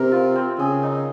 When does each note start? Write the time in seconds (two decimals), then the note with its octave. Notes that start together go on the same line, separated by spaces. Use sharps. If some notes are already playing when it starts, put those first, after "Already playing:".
Already playing: C3 C4 A#4
0.12 F4
0.35 C4
0.59 C#3 G#4
0.83 D#4